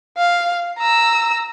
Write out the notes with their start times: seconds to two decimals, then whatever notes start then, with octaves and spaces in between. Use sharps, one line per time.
0.17 F5
0.78 A#5 E6